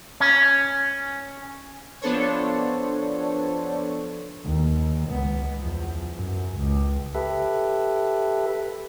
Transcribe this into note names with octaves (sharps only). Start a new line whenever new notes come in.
C#4
F3 B3 D4 A4 C5 C#5
D#2
C#2 B3
E2 F3
F#2
C#2
G4 A4 B4 E5